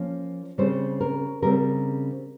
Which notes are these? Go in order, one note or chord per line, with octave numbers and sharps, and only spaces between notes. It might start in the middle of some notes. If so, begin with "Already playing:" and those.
Already playing: F3 A#3 C#4
C#3 G3 C4 C5
A#4
C#3 G3 C4 A#4